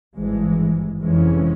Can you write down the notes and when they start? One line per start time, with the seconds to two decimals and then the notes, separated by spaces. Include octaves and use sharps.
0.16 G#1 G2 E3 G#3
1.00 F1 F2 E3 G#3 C#4